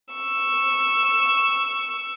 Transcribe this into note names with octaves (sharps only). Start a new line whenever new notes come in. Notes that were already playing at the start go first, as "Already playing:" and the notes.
C#6 E6